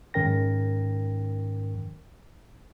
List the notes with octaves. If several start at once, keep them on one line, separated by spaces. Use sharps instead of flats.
G#2 D#3 C#4 A#4 G5 A#6